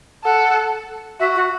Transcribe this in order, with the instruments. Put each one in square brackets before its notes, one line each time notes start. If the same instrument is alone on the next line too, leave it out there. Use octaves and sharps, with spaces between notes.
[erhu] A4 [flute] F#5
[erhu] F#4 [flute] E5
[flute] F#4